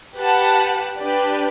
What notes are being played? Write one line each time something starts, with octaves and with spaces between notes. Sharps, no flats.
G4 B4 F#5 A5
D4 G4 B4 D5